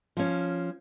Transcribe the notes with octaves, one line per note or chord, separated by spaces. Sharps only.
F3 C#4